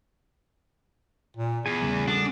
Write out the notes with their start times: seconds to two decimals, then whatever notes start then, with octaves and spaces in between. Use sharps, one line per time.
1.37 A#2
1.66 E2 G#4 G#5
1.82 C#3 G3
2.08 D4 F#4 A4 D#6